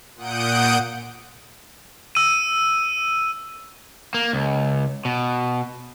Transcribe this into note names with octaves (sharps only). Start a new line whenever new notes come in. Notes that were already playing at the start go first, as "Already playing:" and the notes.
A#2 F#5 D#6 G6 D7
E6 D#7
A#3
C#2
B2